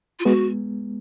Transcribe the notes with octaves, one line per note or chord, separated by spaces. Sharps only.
F4
G#3 B3 F#4